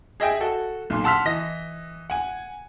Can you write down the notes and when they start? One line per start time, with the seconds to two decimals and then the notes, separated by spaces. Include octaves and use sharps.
0.20 G#4 D#5 E5 G5 G#5
0.41 F#4 A4
0.90 B1 A#2
1.04 F#5 A5 C6 E6 F6 B6
1.25 E3 D#5 A#6
2.10 F#5 G#5